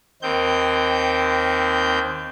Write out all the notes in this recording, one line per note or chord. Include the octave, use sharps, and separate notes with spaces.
D#2 D#3 C4 G6